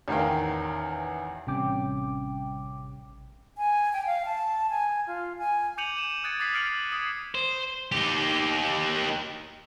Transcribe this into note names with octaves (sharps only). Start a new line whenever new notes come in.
A1 E2 D#3 F5 G5
A1 C3 G3 C#4 G5 D6
G#5
G5
F5
A5
G#5
F4
G#5
D6 G6 C#7 D#7 F7 F#7
D#7 E7
D#6 F#6 G#6 A6 C#7 D7
D6 D#6 A6 B6 C7
F6 G#6 C#7 D7 F7 F#7
D#6 G#6 C7 D#7
C5
D#4 G4